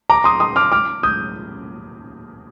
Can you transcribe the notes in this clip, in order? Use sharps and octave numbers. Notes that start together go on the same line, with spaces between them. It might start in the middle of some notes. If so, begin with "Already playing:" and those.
A#5 D6
C6 D#6
C6 D#6
D6 F6
D6 F6
D#6 G6